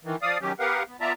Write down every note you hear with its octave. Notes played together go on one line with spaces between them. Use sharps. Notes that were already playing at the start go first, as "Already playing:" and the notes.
D#3 E3
F3 D5 F5 D#6
D#3 F#3 C#4 G4
B3 G4 A#4 B4 F5 F#5
B3
B3 F4 D5 E5 A5 A#5